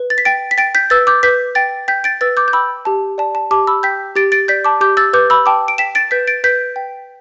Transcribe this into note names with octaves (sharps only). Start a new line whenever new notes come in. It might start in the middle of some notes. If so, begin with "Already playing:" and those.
Already playing: B4
A6
B6
G5 A6 D7
B6
G5 A6 D7
G6 B6
B4 E6 A6
D6 G6
B4 G6 B6
G5 A6 D7
G5 G6 B6
A6 D7
B4 E6 A6
D6 G6
G6
G5 B5 E6
G4 A5
D5 A5
A5
G4 A5 D6
B5 E6
G5 G6 B6
G4 A6 D7
A6 D7
D5 G6 B6
A5 D6
G4 D6 G6
E6 A6
B4 D6 G6
B5 E6
G5 A5 D6
D7
G5 B6 E7
A6 D7
B4 G6 B6
A6 D7
B4 G6 B6
G5